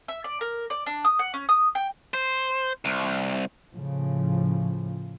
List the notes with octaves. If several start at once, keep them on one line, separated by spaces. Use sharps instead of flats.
E5
D5
A#4
D5
D4
D#6
F#5
C#4
D#6
G5
C5
C2
A2 C#3 F3